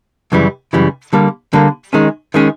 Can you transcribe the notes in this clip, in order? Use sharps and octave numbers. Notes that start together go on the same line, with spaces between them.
F#2 C#3 E3 G3
F#2 C#3 E3 G3
D3 G3 A#3
D3 G3 A#3
D#3 G#3 C#4
D#3 G#3 C#4